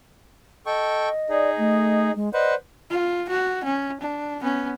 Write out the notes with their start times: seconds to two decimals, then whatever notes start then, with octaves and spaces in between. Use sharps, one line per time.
0.66 A4 D#5 G5 C#6
1.30 D#4 G#4 D5
1.58 A3
2.16 G#3
2.33 B4 C5 D5 D#5 F#5
2.90 F4
3.29 F#4
3.64 C#4
4.01 D4
4.42 B3 C#4